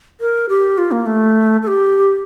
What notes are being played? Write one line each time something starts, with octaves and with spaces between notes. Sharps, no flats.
A#4
G4
F4
A#3
A3
A4
G4